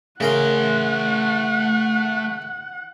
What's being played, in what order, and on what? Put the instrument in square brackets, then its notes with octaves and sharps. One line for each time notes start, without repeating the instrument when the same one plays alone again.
[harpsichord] C#3 A#4 B5 [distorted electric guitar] A3 C6 [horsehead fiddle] F#5